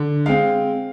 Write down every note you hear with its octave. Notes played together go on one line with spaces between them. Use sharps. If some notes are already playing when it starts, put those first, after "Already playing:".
Already playing: D3
G#3 C4 F5